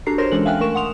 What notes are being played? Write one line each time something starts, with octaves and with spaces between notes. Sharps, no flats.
D4 F#4 G4 A4 A#5 C7
A#4 C5 C#5 C6 A#6
E3 G#3 C#4 D4 A4 F#7
E5 F5 G5 G#5 F6 F#6
A3 A#4 C#6 E7
F#5 C6 D#6 F7